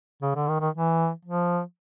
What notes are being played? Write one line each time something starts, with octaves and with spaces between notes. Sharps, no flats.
C#3
D3
D#3
D#3
E3
F3